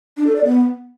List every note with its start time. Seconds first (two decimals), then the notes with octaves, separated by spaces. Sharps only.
0.17 D4
0.26 A4
0.36 D5
0.45 B3